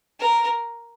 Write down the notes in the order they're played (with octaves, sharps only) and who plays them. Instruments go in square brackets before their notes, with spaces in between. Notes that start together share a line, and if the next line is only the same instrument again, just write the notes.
[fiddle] A#4